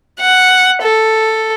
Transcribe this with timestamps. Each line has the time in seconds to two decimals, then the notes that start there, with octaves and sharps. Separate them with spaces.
0.20 F#5
0.82 A4